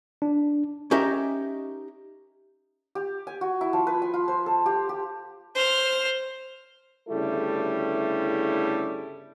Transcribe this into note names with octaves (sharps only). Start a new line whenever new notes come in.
D4
C#4 D#4 G4 A#4 E5
G4
G#5
F#4
E4
F3
B4
G#5
F4
C5
A4
G4
G4
C5 F6
G1 C#3 G3 A3 E4 A4